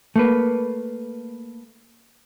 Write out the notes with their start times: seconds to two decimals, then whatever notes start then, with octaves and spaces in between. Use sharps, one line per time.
0.16 A3 A#3 B4